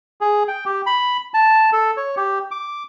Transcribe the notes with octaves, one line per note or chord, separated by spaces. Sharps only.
G#4
G5
G4
B5
A5
A4
C#5
G4
D6